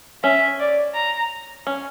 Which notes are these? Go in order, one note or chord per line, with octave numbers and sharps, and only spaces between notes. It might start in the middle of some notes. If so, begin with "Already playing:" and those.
C#4 E5
D5
A#5
C#4